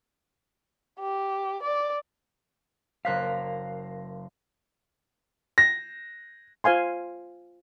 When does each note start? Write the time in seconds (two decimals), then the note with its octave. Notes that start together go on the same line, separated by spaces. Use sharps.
1.00 G4
1.63 D5
3.05 F#1 A#4 C5 F5 F#6 B6
5.58 A#6
6.64 F4 C5 F5 G#5 C6